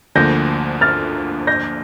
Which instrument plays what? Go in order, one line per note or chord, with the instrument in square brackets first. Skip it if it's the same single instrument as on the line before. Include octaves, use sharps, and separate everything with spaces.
[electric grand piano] D2 D3 F3 A#3 [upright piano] G6 A#6
[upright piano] F6 A6
G6 A#6